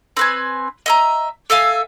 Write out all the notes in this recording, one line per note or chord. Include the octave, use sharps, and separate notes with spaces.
C4 B4 G#5
D#5 E5 A#5
A4 E5 F5 G#5